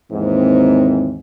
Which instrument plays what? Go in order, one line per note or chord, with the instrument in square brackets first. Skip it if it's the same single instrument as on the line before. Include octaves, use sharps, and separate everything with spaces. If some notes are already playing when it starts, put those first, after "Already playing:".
[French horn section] D#2 G#2 E3 C4